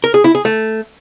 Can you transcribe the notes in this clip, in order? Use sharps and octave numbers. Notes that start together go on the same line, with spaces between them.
A#4
G#4
E4
G#4
A3